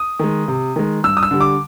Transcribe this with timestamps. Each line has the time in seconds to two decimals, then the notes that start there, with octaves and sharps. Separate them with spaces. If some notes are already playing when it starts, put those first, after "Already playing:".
Already playing: D#6
0.19 D#3 G#3
0.48 C3
0.76 D#3 G#3
1.04 G2 E6
1.17 D#6
1.23 E6
1.31 D3 G3
1.41 D6